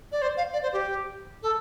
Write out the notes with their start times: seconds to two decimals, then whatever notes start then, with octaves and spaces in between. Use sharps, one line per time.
0.12 D5
0.22 C5
0.37 F5
0.53 D5
0.63 C5
0.73 G4
1.43 A4